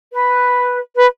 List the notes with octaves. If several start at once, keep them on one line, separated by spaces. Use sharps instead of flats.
B4
B4